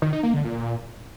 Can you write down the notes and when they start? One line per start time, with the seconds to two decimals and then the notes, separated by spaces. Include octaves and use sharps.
0.02 D#3
0.13 D#4
0.23 A#3
0.34 D3
0.44 A#2